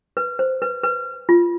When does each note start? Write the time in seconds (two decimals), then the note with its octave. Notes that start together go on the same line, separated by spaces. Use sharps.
0.17 B4
0.39 C5
0.62 B4
0.84 B4
1.29 F4